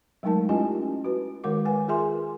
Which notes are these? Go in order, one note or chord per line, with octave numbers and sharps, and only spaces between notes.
F#3 G#3 A3 D#4 A#4 A5
C#4 E4 F4 G4 D#5 G#5
F#4 B4
D#3 G#3 A#4 F#5 D6
B4 F#5 G#5
F4 G#4 A#4 E5 G#5 C6